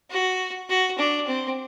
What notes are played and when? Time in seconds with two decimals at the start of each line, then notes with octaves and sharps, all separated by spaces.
0.10 F#4
0.69 F#4
0.98 D4
1.27 C4